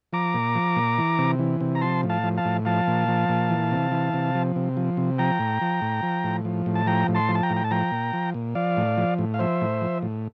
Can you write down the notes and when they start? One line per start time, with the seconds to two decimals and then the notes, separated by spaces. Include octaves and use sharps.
0.13 F3 A#5 D6
0.34 A#2
0.55 F3
0.76 A#2
0.98 E3
1.18 C3
1.39 E3
1.61 C3
1.75 A#5
1.81 F3 A5 C6
2.03 A2
2.10 F5 A5
2.23 F3
2.37 F5 A5
2.45 A2
2.65 F3 F5 A5
2.87 A#2
3.08 F3
3.29 A#2
3.50 E3
3.72 C3
3.92 E3
4.14 C3
4.35 F3
4.56 C3
4.77 F3
4.97 C3
5.18 F3 G5 A#5
5.39 A2
5.61 F3
5.82 A2
6.03 F3
6.24 A2
6.45 F3
6.66 A2
6.75 A5
6.86 F3 G5 A#5
7.08 A2
7.15 A5 C6
7.29 F3
7.35 A5
7.43 G5 A#5
7.50 A2
7.56 G5
7.64 A5
7.71 F3 G5 A#5
7.92 A#2
8.13 F3
8.34 A#2
8.55 F3 D5 F5
8.77 A2
8.97 F3
9.19 A2
9.34 F5
9.39 F3 C5 E5
9.61 A2
9.81 F3
10.03 A2